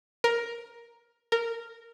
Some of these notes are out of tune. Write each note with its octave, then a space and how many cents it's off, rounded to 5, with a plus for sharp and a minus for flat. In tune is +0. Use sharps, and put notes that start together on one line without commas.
A#4 +10
A#4 -10